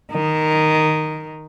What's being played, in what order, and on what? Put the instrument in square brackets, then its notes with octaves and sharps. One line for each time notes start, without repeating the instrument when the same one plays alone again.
[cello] D#3